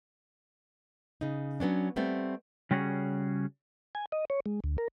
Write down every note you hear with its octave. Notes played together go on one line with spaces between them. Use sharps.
C#3 D#4
F#3 B3 C#4 D4
G3 A3 B3 C4
C#3 G3 C#4 F#4 G#4
G#5
D#5
C#5
G#3
D2
A#4